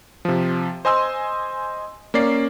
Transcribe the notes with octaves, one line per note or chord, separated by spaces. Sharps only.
C3 F3
C5 D#5 G#5 C6 E6
A#3 C#4 D5 C7